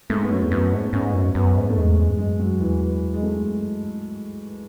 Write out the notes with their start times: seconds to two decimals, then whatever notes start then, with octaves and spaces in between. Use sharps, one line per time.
0.10 G#2 A3
0.22 B3
0.31 F#2 C#4
0.43 E2
0.51 F#2 B3
0.73 G#2 B3
0.93 G#2 C#4
1.14 F#2
1.35 F#2 B3
1.57 G#2
1.70 A3
1.76 E2 G#3
1.98 G#3
2.09 G#2
2.18 F#2 G#3
2.40 F#3
2.60 E2 E3
2.81 E3
3.14 G#3
3.23 A3
3.44 F#2
3.86 G#2